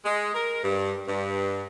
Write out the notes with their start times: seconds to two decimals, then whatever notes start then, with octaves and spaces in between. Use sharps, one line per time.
0.05 G#3
0.35 A#4
0.64 G2
1.08 G2